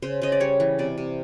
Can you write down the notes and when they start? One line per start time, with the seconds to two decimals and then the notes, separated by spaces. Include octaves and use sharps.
0.02 C#3 C5
0.22 C#3 D#5
0.32 D5
0.40 G3 C#5
0.60 E3
0.79 C3 D5
0.98 C3